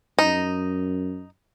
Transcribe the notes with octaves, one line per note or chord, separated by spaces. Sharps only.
F#2 D#4